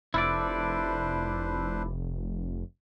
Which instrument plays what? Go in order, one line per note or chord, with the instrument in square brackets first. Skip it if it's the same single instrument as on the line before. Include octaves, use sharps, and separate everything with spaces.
[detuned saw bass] F1 [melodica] D4 B4 C5 [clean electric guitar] E4 A4 D5